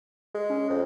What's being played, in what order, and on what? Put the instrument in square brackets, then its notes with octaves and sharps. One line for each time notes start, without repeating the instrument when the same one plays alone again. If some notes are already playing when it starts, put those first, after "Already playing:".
[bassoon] G#3
[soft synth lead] C#4
[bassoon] F2